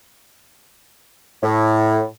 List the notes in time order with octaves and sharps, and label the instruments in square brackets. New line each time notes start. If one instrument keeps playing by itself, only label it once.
[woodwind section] A2